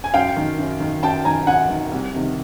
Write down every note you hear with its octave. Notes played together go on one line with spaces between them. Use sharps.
G#5
F#2 F5 G5
D#3
F#2
D#3
F#2 G5 A5
D#3 G#5 A#5
F#2 F#5 G#5
D#3
C2
C3 D#3